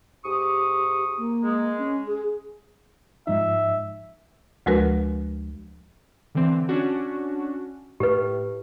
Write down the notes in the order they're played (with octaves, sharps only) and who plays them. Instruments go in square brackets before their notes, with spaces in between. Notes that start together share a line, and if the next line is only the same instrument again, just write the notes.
[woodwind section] G#2 C#6 D#6 [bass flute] G4
[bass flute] A#3
[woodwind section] G#3
[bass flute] C#4
G#4
[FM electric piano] G#2 F3 D#4 [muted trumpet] E5
[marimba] D2 F3 G#3 F#4 A#4 B4
[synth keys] D3 E3 C4
C#4 D4 F#4
[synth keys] A2 [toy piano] G4 B4